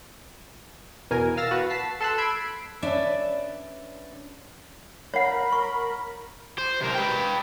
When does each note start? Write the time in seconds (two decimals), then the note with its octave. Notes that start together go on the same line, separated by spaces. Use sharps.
1.10 E2 B2 A#4 G#5
1.37 F5 E6 F6 A6 A#6
1.51 F#4 B4
1.70 A5 B6 C7
2.01 A4 A5 C6 E6 F#6
2.18 B5 E6 G#6 C7 D7
2.82 C#4 D4 B4 D5 E5
5.14 A#4 C#5 F#5 B5
5.52 C#6
6.58 C5
6.81 C3 A#4
6.95 B4 G5